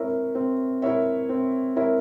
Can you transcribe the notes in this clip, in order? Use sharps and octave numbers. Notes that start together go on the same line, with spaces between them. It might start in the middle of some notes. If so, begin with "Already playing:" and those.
Already playing: C4 E4 A#4 C#5 E5
C4
E4 A#4 C#5 E5
C4
E4 A#4 C#5 E5